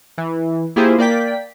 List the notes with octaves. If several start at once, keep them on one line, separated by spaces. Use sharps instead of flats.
E3
A#3 E4 F4 G4 G#4 C5
A#3 D5 G5 B6